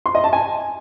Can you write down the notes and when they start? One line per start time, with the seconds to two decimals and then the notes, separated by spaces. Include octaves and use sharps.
0.06 C6
0.15 D#5
0.24 A5
0.33 G#5